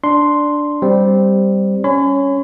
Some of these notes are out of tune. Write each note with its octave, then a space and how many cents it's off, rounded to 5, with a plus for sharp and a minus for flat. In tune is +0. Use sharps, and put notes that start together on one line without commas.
D4 +0 C6 +0
G3 +0 C4 -5
C#4 +0 C#5 +0 B5 +40